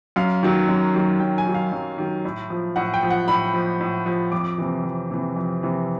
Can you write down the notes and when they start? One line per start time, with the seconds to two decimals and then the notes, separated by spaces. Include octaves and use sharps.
0.16 F#2 F5
0.43 D#3 F#3
0.69 F#2
0.94 D#3 F#3
1.20 F#2 G5
1.38 G#5
1.47 D#3 F#3
1.54 F5
1.72 F#2
1.98 D#3 F#3
2.25 A2
2.50 F3
2.76 A2 F#5
2.94 G5
3.03 F3
3.10 F#5
3.28 A2 B5
3.54 F3
3.81 A2
4.06 F3
4.32 F2 D6
4.58 C3 E3
4.84 F2
5.11 C3 E3
5.36 F2
5.63 C3 E3